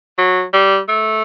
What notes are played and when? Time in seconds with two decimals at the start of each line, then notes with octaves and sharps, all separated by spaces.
0.18 F#3
0.54 G3
0.89 A3